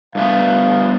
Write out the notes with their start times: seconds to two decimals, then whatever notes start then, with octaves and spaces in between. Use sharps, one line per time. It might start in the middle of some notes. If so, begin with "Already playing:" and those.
0.15 G2 A3 B3 F5